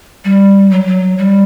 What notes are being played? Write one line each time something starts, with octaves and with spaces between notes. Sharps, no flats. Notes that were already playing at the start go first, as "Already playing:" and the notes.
G3
F#3
F#3
G3